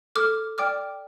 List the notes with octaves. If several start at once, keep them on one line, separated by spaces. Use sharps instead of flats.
A4 D6 F6
D5 G5 D6 F6